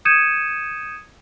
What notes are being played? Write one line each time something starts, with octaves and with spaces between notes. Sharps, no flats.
D#6 G6 G#6 C#7 D#7 E7